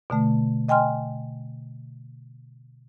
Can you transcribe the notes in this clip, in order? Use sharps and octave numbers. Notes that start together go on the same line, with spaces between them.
B2 D3 A3
D#5 G5 G#5 C6 F6